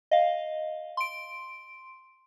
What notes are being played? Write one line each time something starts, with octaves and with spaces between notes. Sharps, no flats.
D#5 F5
C6 D7